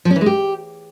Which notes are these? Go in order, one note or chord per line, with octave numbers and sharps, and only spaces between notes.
F3
C#4
E3
G#3
G4